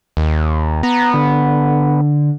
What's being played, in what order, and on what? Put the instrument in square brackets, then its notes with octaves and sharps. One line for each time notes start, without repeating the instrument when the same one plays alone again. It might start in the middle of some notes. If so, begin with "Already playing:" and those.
[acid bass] D#2
[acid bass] B3 [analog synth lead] A#5
[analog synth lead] D3